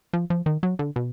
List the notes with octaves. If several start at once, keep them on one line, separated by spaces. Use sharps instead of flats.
F3
F3
D#3
F#3
D3
B2